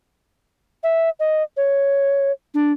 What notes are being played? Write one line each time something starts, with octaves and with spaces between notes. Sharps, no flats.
E5
D#5
C#5
D4